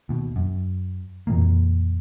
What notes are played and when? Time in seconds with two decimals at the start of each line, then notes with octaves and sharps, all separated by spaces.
0.09 D#2 B2
0.36 F#2
1.27 F2 A#2 E3 A#3